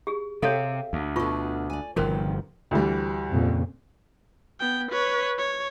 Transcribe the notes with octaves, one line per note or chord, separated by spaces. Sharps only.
G4 G#4
C3 G4 A4 C#5 E5 F5
D2
B2 D3 F4 C#6
D5 G#5
G1 E2 C3 D#3 F3 F#4 A#4 C5
D2 E3 G3
F2 A#2 C#3
B3 G5
B4 C#5
C#5